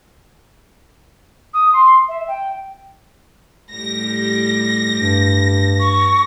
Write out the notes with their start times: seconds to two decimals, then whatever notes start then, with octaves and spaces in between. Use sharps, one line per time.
1.54 D#6
1.73 C6
2.09 E5
2.28 G5
3.72 A2 G3 G4 A#6
4.95 G2
5.80 C#6